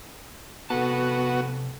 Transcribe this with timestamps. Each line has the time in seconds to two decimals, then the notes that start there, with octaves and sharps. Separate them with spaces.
0.70 C3 B3 F#4 A4 A5